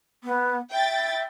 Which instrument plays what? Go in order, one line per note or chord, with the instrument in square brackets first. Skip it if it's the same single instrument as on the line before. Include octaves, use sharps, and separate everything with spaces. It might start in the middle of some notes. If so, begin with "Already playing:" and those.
[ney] B3
[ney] E5 [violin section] G5 A6